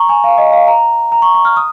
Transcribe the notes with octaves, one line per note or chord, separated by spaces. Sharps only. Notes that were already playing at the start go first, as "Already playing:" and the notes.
Already playing: A#5 C#6
G#5
F5
D#5
F5
A#5
A#5
C#6
C#6
F6
D#6